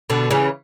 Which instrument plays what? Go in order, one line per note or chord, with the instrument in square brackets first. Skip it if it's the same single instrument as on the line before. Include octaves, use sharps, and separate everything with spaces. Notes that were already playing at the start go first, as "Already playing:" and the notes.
[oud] B2 D3
C#3 E3